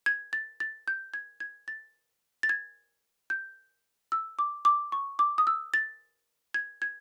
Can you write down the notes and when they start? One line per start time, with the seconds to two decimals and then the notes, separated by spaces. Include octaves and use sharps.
0.06 G#6
0.33 A6
0.60 A6
0.88 G6
1.14 G#6
1.40 G#6
1.68 A6
2.43 A6
2.49 G#6
3.30 G6
4.12 E6
4.39 D6
4.65 D6
4.92 C#6
5.19 D6
5.38 D#6
5.47 E6
5.74 A6
6.54 G#6
6.82 G#6